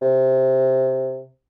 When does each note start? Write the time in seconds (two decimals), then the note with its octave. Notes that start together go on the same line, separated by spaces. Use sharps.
0.02 C3